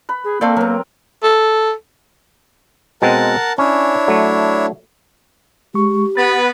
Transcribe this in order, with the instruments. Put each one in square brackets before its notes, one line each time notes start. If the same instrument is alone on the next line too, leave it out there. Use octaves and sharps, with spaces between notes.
[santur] B4 B5
[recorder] G#4
[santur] A3 C4 G5 [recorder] A#3 [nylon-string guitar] A4 D5 F5
[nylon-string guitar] F#3 B3 [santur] A#4
[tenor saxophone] A4
[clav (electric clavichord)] B2 G#3 C4 [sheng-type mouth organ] A#4 F#5 A5
[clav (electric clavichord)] C#4 [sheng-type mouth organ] D4 E4 C#5
[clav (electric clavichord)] F#3 A3
[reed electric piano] G#3 C#6 [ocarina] G4
[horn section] B3 B4 [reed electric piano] A6